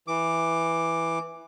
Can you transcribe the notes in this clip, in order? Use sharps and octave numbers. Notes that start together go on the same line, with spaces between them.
E3 D6